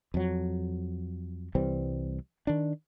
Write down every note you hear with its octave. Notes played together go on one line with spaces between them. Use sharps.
F2 F#3
C2 E3 G3 C4
D#3 D4